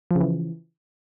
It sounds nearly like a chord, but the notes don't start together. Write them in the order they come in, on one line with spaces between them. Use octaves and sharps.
F3 C#3 E3